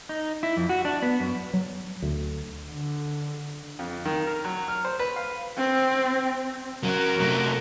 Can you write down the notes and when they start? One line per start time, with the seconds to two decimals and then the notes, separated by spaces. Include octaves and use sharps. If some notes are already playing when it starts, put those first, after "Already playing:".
0.09 D#4
0.43 E4
0.57 F2
0.69 F#4
0.85 D4
1.02 B3
1.20 F#2
1.53 F#3
2.02 D2
2.70 D3
3.79 F2
4.05 D#3
4.27 A#4
4.45 F#3
4.68 F6
4.85 C5
4.99 B4
5.16 F5
5.58 C4
6.83 F#3 C#4 F#4 A#4
7.19 C3 A3